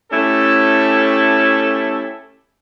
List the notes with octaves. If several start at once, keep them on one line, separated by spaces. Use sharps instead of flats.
A3 C#4 E4 G4 A4